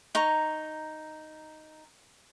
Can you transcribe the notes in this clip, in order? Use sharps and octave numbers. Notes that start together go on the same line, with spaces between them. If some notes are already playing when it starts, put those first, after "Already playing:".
D#4 A#5 C#6